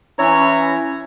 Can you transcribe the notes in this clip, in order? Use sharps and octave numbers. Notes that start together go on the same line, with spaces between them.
E3 C#4 E4 C#5 A#5